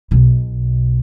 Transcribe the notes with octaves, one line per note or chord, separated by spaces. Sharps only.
B1 B2